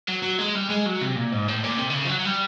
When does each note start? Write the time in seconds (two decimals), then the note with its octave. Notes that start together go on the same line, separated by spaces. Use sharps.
0.09 F#3
0.23 F#3
0.39 G#3
0.55 G3
0.70 G#3
0.86 F#3
1.01 C3
1.16 A#2
1.32 G#2
1.48 A2
1.64 A#2
1.78 C3
1.90 D3
1.94 C#3
2.05 F3
2.09 F#3
2.20 F#3
2.25 G3